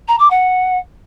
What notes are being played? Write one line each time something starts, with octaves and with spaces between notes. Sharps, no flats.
A#5
D6
F#5